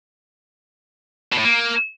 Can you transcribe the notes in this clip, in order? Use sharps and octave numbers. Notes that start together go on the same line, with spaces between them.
B2
A2
A#3